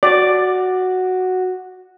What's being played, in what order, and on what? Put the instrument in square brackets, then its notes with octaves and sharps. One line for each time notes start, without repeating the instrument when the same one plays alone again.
[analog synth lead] F#4 [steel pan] D5